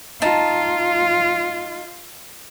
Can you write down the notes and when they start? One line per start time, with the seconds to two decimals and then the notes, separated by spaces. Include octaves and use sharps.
0.22 D#4 F4 A5